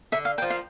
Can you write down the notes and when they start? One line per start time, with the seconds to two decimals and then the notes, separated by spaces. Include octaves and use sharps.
0.12 D3 E5
0.25 F5
0.38 A#3 G5
0.42 F3
0.50 F5